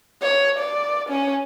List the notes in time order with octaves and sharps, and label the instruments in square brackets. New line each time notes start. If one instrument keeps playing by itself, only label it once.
[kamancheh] C#5
D5
C#4